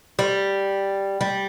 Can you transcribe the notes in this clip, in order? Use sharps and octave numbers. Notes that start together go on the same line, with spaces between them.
G3
G3